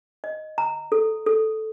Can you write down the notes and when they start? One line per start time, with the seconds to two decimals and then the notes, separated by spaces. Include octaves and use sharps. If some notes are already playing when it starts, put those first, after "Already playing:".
0.24 D#5
0.58 A#5
0.92 A4
1.26 A4